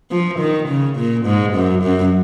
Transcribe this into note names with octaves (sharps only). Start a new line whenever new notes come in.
F3
D#3
C#3
A#2
G#2
F#2
F#2